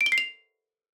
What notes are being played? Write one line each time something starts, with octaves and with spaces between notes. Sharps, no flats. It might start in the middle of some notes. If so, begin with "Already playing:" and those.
D7
G7
C7
F7